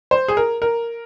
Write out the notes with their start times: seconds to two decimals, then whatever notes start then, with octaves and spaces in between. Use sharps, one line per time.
0.11 C5
0.28 G#4
0.37 A#4
0.62 A#4